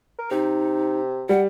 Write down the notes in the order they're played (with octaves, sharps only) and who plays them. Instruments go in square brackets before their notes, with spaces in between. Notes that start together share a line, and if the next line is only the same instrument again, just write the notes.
[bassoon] A#4
[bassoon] C3 [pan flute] D#4
[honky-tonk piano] G3 [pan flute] F#5